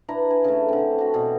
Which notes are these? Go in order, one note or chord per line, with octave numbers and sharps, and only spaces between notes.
D4 E4 B4 A#5
G#5
C#3 A3
D3 C4
D4 F#4
B2 E3 C4 D5